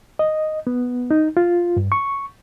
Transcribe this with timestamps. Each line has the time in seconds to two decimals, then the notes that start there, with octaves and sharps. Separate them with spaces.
0.19 D#5
0.67 B3
1.11 D#4
1.37 F4
1.77 G2
1.92 C#6